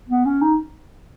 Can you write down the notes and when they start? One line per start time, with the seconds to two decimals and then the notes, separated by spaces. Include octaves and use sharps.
0.09 B3
0.25 C#4
0.42 D#4